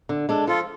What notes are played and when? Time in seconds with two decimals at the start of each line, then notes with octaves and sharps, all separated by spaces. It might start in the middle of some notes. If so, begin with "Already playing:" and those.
0.09 D3
0.29 G#3 D4 A4
0.47 F3 F4 A4